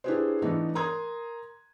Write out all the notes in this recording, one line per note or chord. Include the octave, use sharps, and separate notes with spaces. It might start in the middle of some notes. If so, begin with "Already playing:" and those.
D4 E4 G4 G#4 B4 C5
E3 A3 B3 D4 D#4
A#4 A#5 C6 D#6 G#6